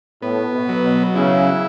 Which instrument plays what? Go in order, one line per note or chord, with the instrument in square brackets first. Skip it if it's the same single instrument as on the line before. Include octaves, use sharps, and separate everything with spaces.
[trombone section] A2 [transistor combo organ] B3
[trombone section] B2
[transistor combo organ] F#3
[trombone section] B2
[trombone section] C#3 [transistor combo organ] E4